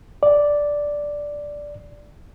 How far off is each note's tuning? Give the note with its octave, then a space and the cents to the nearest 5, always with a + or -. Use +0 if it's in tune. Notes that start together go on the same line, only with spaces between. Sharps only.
D5 -5